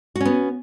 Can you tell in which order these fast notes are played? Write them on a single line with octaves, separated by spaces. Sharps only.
F#4 C#4 B3